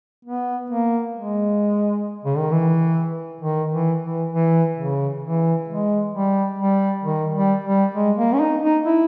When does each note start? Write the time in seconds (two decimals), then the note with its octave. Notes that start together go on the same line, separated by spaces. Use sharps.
0.25 B3
0.70 A#3
1.15 G#3
2.25 C#3
2.38 D#3
2.51 E3
3.41 D#3
3.72 E3
4.02 E3
4.32 E3
4.78 C#3
5.23 E3
5.68 G#3
6.14 G3
6.59 G3
7.04 D#3
7.34 G3
7.64 G3
7.95 G#3
8.17 A#3
8.33 C#4
8.40 D#4
8.62 D#4
8.86 E4